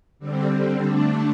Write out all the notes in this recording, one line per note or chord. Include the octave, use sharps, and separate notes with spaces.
D3 G3 C4
D3 A3 D4